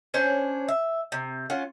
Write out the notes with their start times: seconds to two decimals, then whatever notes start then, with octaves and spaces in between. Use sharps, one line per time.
0.14 C#4 D4 C5 C#5
0.68 E5
1.12 C3
1.50 C#4 F4 F#5